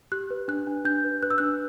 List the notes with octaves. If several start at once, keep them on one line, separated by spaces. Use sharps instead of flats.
G4 F#6
B4
D4 F#6
D4
D4 G6
B4
B4 F#6
E6
D4 F#6